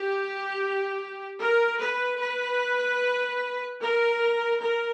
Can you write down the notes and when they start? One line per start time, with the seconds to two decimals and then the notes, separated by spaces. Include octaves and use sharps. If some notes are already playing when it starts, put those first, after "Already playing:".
Already playing: G4
1.40 A#4
1.80 B4
2.20 B4
3.80 A#4
4.61 A#4